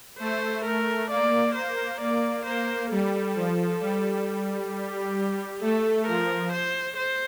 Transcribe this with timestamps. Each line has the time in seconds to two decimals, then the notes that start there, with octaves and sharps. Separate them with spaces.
0.19 A3 C5
0.65 A#4
1.10 A#3 D5
1.56 C5
2.00 A#3 D5
2.45 A#3 C5
2.91 G3 A4
3.36 F3
3.81 G3
4.72 G4
5.61 A3 A4
6.07 F3 A#4
6.53 C5
6.97 C5